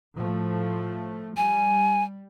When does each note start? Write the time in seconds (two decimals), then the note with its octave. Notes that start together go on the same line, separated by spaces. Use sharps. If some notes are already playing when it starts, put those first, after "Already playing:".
0.15 A2 F3 A3
1.37 G3 G#5